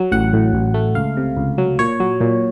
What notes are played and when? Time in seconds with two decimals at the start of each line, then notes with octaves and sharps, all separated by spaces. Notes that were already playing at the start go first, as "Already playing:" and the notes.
Already playing: F#3
0.12 A1 F#5
0.33 A2
0.53 A1
0.74 A3
0.95 C#2 F5
1.17 C3
1.37 C#2
1.58 F#3
1.79 A#2 C#5
2.00 F#3
2.21 A#2